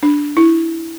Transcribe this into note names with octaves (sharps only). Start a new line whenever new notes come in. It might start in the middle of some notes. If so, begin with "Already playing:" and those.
D4
E4